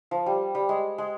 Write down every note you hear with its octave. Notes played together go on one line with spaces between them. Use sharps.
F3
G3
G3
G#3
G#3